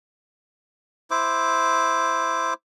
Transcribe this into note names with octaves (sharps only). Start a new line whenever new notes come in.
E4 C5 D6